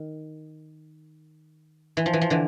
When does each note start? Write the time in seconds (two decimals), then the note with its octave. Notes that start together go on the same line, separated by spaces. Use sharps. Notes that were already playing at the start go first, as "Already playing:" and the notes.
Already playing: D#3
1.97 E3
2.06 F3
2.13 E3
2.21 F3
2.30 D3 E3